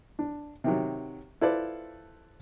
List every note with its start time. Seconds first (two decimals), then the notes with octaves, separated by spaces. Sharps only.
0.19 D4
0.64 C3 D#3 F#3
1.41 E4 F4 A4 B4 C5 D5